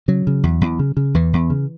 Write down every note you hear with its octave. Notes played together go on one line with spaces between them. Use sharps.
C#3 F#3
C#3
E2
E2
C#3
C#3
E2 E3
E2
C#3